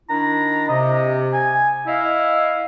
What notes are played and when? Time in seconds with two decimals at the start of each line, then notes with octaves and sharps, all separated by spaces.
0.09 D#3 D4 E4 A#5
0.69 C3 D#5
1.33 G#5
1.86 E4 D#5 F5